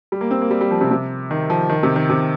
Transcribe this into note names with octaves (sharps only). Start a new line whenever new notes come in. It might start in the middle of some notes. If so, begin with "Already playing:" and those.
G3
A#3
C4
A#3
G3
G3
F3
C3
C3
D#3
F3
D#3
C3
D#3
C3